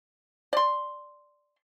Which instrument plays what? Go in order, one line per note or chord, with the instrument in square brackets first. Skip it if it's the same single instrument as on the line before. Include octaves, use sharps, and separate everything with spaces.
[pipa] D5 C6